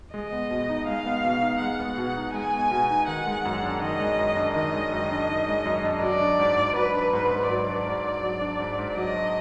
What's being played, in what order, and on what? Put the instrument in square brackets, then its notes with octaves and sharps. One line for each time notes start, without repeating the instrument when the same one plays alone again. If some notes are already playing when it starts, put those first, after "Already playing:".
[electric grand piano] G#3 [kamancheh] D#5
[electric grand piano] B3
B2
D#4
[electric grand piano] G#3 [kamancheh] F5
[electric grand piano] B3
B2
D#4
[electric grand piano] G#3 [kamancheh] F#5
[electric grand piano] B3
B2
D#4
[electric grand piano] G#3 [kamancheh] G#5
[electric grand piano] B3
B2
D#4
[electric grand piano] D#3 [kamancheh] F#5
[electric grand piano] G#3
F#2
D4
[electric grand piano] D#3 [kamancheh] D#5
[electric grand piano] G#3
F#2
D4
[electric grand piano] D#3 [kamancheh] D#5
[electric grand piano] G#3
F#2
D4
D#3
G#3
F#2
D4
[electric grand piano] F#3 [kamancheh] D5
[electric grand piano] D4
G#2
G#2
[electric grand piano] F#3 [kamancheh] B4
[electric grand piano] D4
G#2
G#2
[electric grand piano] F#3 [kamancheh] D5
[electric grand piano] D4
G#2
G#2
F#3
D4
G#2
G#2
[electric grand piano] F#3 [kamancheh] D#5
[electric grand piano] D4